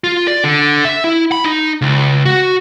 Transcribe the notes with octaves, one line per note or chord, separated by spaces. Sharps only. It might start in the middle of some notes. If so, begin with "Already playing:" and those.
F4
D5
D3
E5
E4
B5
D#4
C#2
F#4